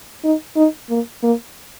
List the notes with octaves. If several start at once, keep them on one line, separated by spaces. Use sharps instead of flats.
D#4
D#4
A#3
A#3